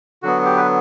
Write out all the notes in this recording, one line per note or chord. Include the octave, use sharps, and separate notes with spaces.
D3 F#3 B3 F#4
G4
B4